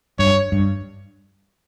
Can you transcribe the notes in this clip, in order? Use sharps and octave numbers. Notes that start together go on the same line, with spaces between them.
G2 C#5
G2